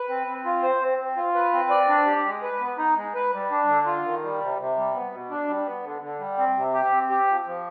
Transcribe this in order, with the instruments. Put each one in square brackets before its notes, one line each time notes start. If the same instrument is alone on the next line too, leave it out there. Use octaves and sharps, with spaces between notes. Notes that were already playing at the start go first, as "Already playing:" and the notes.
Already playing: [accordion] B4
C4
C4
F4
C5
C4
C4
F4
B4
C4
D5
D4
G4
G#3
B4
B3
D#4
G#3
B4
G3
D4
D3
F4
D#3
G3
C3
C3
G3
B3
B2
D4
G3
B3
D3
D3
G3
C4
C3
G4
C4
G4
F3
F3